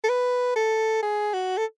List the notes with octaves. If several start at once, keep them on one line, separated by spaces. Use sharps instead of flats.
A4
B4
A4
G#4
F#4
A4